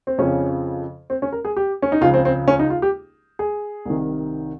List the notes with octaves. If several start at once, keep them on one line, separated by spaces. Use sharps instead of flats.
C4
F2 C#3 F3 C#4
C4
C#4
A#4
G#4
G4
C#4
D#4
C#2 C#3 F3 F4
C4
C4
C#4
D#4
F4
G4
G#4
C2 C3 D#3